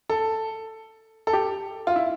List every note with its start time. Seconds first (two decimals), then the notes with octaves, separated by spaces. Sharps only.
0.10 A4
1.27 A4
1.33 G4
1.87 F4
1.96 E4